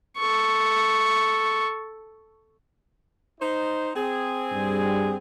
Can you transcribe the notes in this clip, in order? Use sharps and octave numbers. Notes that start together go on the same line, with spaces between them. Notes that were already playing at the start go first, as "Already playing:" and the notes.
A4 C#6
D#4 C5
C4 G#4
G2 G3